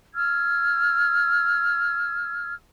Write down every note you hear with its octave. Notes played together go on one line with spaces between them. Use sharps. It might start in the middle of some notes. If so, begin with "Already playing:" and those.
E6 F6 G#6